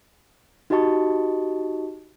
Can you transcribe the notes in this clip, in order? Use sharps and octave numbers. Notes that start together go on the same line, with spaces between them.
D#4 F#4 G4 D#5 A5 C#6